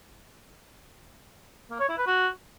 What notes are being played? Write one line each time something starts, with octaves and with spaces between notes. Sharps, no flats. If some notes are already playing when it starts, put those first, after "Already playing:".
A#3
C#5
E4
B4
F#4